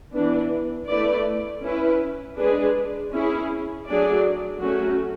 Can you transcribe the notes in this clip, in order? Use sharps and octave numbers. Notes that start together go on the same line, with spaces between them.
E3 B3 D4
A3 E4 B4 D5
C#4 E4 B4
G#3 D4 G#4 B4
C#4 E4 G#4
F#3 A3 D4 G#4 D5
F#3 A3 C#4 F#4